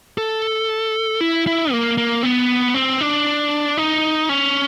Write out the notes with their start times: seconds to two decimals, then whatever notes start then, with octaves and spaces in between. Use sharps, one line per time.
0.18 A4
1.21 E4
1.47 E4
1.72 A#3
1.98 A#3
2.23 B3
2.74 C4
3.01 D4
3.77 D#4
4.29 C#4